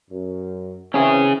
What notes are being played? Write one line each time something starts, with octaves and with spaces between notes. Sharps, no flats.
F#2
E3 C4 C#4 G#4